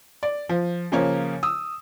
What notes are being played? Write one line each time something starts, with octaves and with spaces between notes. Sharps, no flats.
D5
F3
C#3 F3 A#3 C#5
D#6 E6